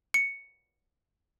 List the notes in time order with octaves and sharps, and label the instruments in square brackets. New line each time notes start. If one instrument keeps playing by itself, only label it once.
[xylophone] C#7